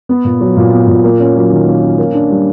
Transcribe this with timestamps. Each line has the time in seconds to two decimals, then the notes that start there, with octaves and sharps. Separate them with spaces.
0.09 B3
0.25 A#2
0.41 F#3
0.56 A#2
0.73 B3
0.88 A#2
1.04 A#3
1.20 C#4
1.36 F#3
1.51 D#3
1.67 A#3
1.83 C#4
1.98 A#3
2.14 D4
2.30 G3